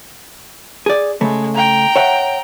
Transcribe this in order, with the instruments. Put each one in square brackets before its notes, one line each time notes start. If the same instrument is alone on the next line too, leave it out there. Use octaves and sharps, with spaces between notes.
[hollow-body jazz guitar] G#4 D5
[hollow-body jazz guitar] C#3 A3 [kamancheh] G#3
[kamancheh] G5 A#5
[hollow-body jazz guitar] C#5 E5 F#5